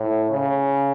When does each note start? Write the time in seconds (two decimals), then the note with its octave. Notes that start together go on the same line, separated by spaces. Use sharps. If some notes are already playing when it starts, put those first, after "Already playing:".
Already playing: A2
0.31 C#3